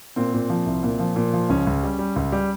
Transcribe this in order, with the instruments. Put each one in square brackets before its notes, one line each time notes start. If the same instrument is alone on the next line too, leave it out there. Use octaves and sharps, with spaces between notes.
[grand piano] A#2 C4
A#2
F3
C2
A#2
F3
A#2
F3
C#2 C#4
C#2
G3
G3
C#2
G3